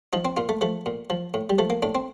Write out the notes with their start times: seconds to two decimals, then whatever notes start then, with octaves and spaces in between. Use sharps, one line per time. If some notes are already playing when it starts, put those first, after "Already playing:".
0.13 F3 D#4
0.25 C4
0.37 A#2 F4
0.49 A3
0.61 F3 A3
0.86 A#2
1.10 F3
1.34 A2
1.50 G3
1.58 F3 A3
1.70 A#3
1.82 A2 D4
1.95 C4